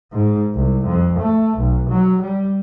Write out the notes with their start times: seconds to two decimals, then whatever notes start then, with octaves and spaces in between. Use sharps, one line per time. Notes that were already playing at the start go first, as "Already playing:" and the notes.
0.13 G#2
0.55 C2
0.86 F2
1.19 A3
1.58 B1
1.90 F#3
2.22 G3